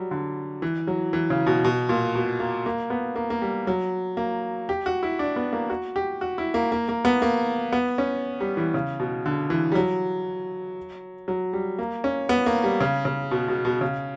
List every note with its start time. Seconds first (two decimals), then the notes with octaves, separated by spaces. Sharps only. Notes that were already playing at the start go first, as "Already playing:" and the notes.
Already playing: F#3 G3
0.11 D3
0.62 E3
0.87 F#3
1.13 E3
1.30 C#3
1.47 B2
1.65 B2
1.89 A#2
2.15 B2
2.40 A#3
2.66 A#3
2.90 B3
3.16 A#3
3.30 A#3
3.42 G3
3.67 F#3
4.17 A#3
4.69 G4
4.86 F#4
5.03 E4
5.19 D4
5.36 B3
5.53 A#3
5.70 F#4
5.96 G4
6.21 F#4
6.38 E4
6.54 A#3
6.72 A#3
6.89 A#3
7.05 B3
7.22 A#3
7.72 B3
7.98 C#4
8.40 G3
8.57 E3
8.74 C#3
9.00 B2
9.26 D3
9.50 E3
9.72 G3
9.75 F#3
11.28 F#3
11.53 G3
11.79 A#3
12.04 C#4
12.29 B3
12.46 A#3
12.64 G3
12.80 C#3
13.05 C#3
13.31 B2
13.48 B2
13.65 B2
13.81 C#3